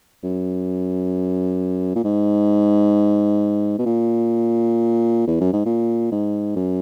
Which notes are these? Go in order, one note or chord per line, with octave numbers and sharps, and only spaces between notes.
F#2
A#2
G#2
B2
A#2
E2
F#2
G#2
A#2
G#2
F#2